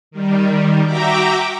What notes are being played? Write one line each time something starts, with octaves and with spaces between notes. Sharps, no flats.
D#3 G3
F#4 E5 G5 A#5 D6